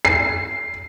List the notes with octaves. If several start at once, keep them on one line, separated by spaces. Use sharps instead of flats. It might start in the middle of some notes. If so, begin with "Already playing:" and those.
C7